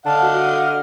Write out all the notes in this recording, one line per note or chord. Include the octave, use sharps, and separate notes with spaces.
D3 D#5 F5 F#5 A5
F#4
F6